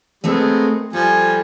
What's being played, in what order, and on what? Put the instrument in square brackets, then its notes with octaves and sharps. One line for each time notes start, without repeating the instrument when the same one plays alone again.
[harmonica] G#3 B3 [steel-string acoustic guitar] A3 C4 A#4
[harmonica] F3 G3 [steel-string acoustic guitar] A4 [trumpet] G#5